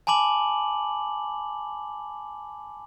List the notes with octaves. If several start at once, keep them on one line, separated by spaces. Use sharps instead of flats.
G#5 A5 B5 D6 F#7